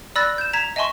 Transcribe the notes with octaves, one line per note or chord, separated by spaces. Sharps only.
D5 B5 E6 F#6 A6 A#6
G6 E7
A#5 G#6 B6 E7
D#5 E5 G#5 A5 C6 C#6